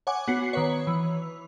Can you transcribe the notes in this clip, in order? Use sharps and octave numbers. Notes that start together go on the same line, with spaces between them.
C#5 F#5 G#5 D6
B3 F#4 C7 C#7
D#3 B4 C#5
E3